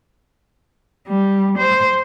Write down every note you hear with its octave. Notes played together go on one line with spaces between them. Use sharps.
G3
C5